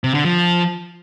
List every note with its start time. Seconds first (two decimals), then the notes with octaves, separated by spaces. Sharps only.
0.04 C3
0.14 D3
0.25 F3